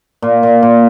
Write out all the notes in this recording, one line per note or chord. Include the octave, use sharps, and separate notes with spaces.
A#2
A#2
A#2